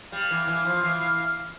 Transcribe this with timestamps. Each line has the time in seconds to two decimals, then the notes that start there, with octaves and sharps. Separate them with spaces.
0.12 G3 F5
0.31 E3
0.48 E3
0.65 F3
0.83 E3